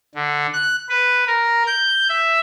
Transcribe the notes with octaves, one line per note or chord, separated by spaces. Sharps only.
D3
F#6
B4
A#4
G6
E5